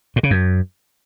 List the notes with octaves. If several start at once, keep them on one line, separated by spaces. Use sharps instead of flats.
A2
C#3
F#2